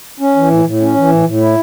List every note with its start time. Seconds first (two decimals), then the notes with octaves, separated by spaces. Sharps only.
0.20 C#4
0.36 E3
0.51 A2
0.65 A2
0.81 C#4
0.96 E3
1.11 A2
1.26 A2
1.41 E4